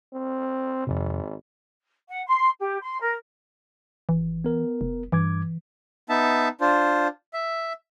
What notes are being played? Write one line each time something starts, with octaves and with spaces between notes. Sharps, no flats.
C4
G#1 F2 C3
F#5
C6
G4
C6
A#4
G#1 E3
B3 A#4
F1
G2 E3 D6 G#6
B3 D#4 E5 A5
D4 F4 C5
E5